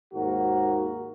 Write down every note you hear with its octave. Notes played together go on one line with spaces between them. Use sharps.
D#2 G#2 A#3 F#4